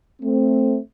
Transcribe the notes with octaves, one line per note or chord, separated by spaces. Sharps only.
A3 C4